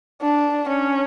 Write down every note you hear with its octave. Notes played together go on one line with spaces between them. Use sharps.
D4
C#4